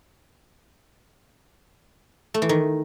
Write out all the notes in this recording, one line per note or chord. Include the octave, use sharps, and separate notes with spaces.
A3
E3
D#3